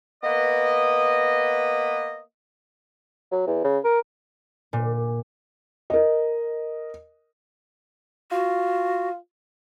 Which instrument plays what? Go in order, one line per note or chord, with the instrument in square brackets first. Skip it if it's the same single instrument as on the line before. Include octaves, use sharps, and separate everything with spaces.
[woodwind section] A#3 B3 B4 D#5
[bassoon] F#3
E2
C#3
A#4
[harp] A#2
[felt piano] A#4 D#5
[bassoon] F4 [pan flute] F#4